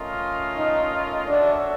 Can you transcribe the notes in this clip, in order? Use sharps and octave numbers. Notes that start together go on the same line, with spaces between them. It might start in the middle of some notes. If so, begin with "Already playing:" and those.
Already playing: A3 C#4 F4 A#4 D#5
D#4
D4 F#4 A4 C#5 E5